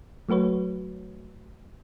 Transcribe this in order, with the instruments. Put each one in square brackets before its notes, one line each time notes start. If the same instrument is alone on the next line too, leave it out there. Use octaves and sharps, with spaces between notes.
[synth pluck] F#3 A3 F#4 B4 C#5